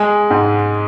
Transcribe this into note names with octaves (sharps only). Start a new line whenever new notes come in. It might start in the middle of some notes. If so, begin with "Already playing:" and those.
Already playing: G#3 G#5
G#2